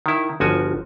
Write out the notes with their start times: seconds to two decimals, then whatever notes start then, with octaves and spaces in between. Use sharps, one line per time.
0.06 D#3 E4
0.40 G1 F3 F#4 G#5